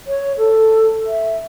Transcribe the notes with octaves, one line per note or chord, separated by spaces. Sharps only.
C#5
A4
E5